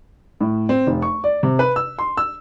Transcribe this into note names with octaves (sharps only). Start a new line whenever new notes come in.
A2
C4
F1
C#6
D5
C3
B4
E6
C6
E6